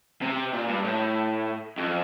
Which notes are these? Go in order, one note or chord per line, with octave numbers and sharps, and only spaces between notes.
C3
A#2
G2
A2
F2